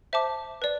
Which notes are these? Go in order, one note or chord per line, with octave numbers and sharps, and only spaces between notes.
C5 E5 A5 D6
B4 D5